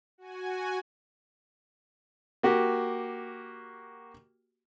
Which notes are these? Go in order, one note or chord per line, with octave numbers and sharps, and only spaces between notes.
F#4 G#5
A#3 F#4 G4